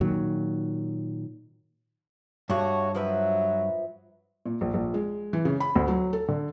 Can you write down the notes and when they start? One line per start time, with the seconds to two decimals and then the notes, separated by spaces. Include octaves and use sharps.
0.01 A#2 D#3 F#3
2.50 G2 A3 F#4 C#5
2.95 F3 F#3 B4 E5
4.46 A#2
4.61 A#1
4.74 A#1
4.94 G#3
5.33 E3
5.45 C#3
5.60 B5
5.75 D2
5.88 F#3
6.13 A4
6.28 D3